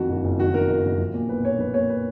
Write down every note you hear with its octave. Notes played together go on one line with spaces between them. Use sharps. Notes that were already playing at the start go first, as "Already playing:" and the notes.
Already playing: F2 D#3 F#4
F#1
F#1
D#3 F#4
F2 A#4
F#1
F#1
F3
A#2
B1 B4
B1 C#5
F3 B4
A#2 C#5
B4